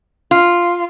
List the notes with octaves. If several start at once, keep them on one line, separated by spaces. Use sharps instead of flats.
F4